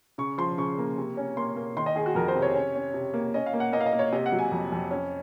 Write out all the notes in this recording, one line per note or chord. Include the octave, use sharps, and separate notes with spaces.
C#3 C#6
F3 C6
C#3 C#6
A#3
C3
C#4
A#3 C6
A#3
D#3 C6
D#5
D#3 G#4
F#4
F2 A#4
C5
C3
C#5
C#4
C#4
C3
A#3
C#4 D#5
F5
A#3
F#5
A#3 D#5
F5
D#5
A#3
C#5
C3 D#5
F#5
F#3
G#5
F2
F2
C#4